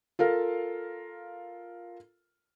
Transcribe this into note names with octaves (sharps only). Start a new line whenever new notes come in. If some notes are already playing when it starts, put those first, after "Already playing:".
F4 A4 A#4 F5